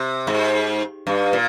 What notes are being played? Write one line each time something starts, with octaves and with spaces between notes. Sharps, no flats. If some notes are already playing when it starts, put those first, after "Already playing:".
Already playing: C3
G#2
G2
A#2